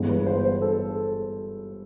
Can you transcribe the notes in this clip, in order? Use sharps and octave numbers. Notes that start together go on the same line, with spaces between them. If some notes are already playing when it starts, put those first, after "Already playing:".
Already playing: G1 G2 E3 G#3 B3
B4
C5
C5
A4